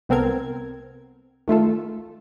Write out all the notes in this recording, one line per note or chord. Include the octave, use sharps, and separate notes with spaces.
C2 B3 C4 A4 A#4 G#6
D#3 A3 F4 A4